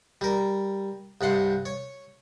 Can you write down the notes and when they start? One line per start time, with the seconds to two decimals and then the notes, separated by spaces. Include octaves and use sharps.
0.21 G3 A#4
1.21 C2 G2 F#5 C6
1.66 C#5